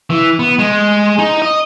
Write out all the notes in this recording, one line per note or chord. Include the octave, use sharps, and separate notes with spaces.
E3
B3
G#3
D#4
D#5